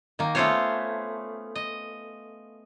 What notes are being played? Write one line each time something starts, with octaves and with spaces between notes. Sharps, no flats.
D#3 A#3
A3 B3 C#4 F4 C5 C#5
D#5